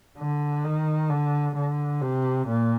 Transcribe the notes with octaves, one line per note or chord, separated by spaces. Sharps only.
D3
D#3
D3
D3
C3
A#2